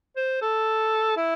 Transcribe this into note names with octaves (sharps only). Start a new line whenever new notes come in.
C5
A4
E4